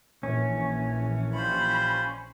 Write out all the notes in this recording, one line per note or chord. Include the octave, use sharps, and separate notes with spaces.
A#1 E3 F3 C#4
G3 F4 C5 B5